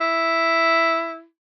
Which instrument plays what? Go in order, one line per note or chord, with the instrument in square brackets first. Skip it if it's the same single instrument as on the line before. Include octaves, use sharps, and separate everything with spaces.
[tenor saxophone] E4